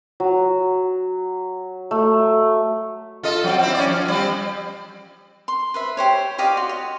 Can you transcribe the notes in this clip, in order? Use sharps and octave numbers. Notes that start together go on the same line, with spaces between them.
F#3
A3
F4 A4 D#5
F#3 C4
C4 E4
C#4 D5
F3
G3 C4
C6
B4 C5 E5
G4 C5 C#5
G4 D5 D#5 F5
F#4 C6
C#5